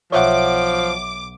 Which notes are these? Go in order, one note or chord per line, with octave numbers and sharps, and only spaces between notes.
B1 F3 C#5 E5 F#5 D6